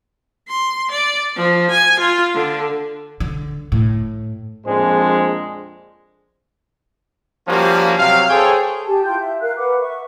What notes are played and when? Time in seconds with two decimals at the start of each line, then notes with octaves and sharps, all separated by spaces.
0.48 C6
0.91 D5
1.36 F3
1.71 G#5
2.00 F4
2.34 D3
3.20 D3
3.72 A2
4.66 A#1 F2 G#3 D4 C5
7.47 F3 G3 A#3 C#4 F#4
7.98 C3 F#3 F5
8.30 G#4 A4 C5 C#5 G5
8.86 G4 G#5 A5
9.04 E4 F4 G5 G6
9.18 E5
9.42 A#4 F5 F#6
9.57 A#4 B4 F#5 D6
9.80 E5 C#6